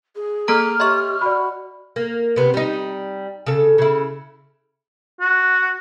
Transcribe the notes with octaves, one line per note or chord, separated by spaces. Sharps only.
G#4
A#3 A4 A#5 F6
G4 C#5 D#5 E5 C6 C#6
F#4 D5 B5
A#3
C3 B3
G3 D#4
C#3 A4
C#3 E4
F#4